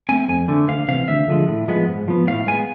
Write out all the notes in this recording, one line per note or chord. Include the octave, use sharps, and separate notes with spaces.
A3 C4 G#5
F2 G#5
D3 A3
D2 F5
C3 E3 F5
D2 E5
D3 F3 G#3
A2
F3 G#3 B3
G#2
F3 B3
A2 F5
G#3 B3 G#5